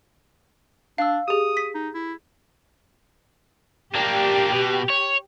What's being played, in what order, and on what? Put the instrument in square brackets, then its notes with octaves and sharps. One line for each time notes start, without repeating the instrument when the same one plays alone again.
[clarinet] D4 [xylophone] F5 E6
[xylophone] G4 G#4 [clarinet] D#6
[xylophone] B6
[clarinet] D#4
E4
[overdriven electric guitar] A#3 D4 [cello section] G4
[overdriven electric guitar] B2
C#5